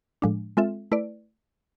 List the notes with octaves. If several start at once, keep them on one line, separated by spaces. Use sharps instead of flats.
A2 F3 G#3 D4
G#3 C4 F4 A4 E5
A3 E4 B4 D5